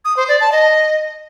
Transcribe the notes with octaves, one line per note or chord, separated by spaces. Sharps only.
D#6
C5
D5
A5
D#5